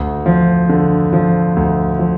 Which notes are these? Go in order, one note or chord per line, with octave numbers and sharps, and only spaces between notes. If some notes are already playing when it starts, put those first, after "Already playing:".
Already playing: D2
F3
D3
F3
D2
F3